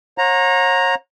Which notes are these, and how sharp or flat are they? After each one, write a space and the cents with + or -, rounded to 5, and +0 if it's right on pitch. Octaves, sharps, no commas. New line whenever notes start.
C#5 -35 F#5 -40 A#5 +0